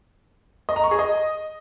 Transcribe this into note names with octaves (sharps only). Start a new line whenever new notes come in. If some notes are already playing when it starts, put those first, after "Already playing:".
D#5
A#5
C#6
G#4
D#5